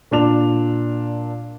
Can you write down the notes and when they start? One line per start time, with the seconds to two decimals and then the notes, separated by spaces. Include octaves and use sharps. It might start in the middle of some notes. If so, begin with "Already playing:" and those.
0.11 A#2 D4 F7